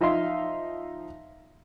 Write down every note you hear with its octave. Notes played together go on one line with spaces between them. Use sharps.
F3 D#4 E5 F5 C6